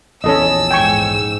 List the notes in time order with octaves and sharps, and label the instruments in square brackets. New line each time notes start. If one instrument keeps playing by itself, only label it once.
[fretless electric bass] A#1 E2 C#4 [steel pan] A4 D#5 [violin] E6
[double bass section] G#2 [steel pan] G5 G#5 C#6